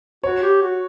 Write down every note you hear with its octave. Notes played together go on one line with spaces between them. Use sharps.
F#4 C#5
G4
F#4